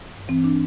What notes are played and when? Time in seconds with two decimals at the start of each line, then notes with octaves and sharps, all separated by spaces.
0.13 G2
0.28 E3 C4
0.44 D4